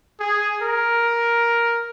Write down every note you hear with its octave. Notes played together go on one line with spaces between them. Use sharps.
G#4
A#4